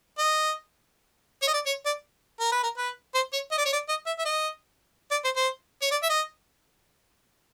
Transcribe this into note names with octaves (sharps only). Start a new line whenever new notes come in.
D#5
C#5
D#5
D5
C#5
D5
A#4
B4
A#4
B4
C5
C#5
D#5
D5
C#5
D5
D#5
E5
E5
D#5
D5
C5
C5
C#5
D5
E5
D#5